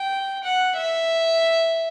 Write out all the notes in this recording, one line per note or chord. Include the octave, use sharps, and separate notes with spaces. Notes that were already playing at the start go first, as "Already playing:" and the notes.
Already playing: G5
F#5
E5